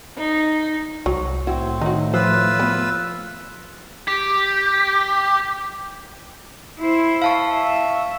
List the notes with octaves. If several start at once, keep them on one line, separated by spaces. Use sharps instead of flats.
D#4
C2 F#3
A2 C4 E4 F#4
D#3 D#4 F#4
F3 F4 B4 C5 E6
B3
G4
E4 C5
F5 A5 C#6
E5